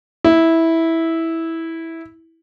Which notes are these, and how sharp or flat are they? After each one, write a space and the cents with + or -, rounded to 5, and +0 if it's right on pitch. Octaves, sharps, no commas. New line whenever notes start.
E4 -10